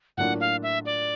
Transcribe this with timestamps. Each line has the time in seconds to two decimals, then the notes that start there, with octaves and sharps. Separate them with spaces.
0.17 A2 F#3 A#3 D4 F4 F#5
0.40 F5
0.63 E5
0.86 D5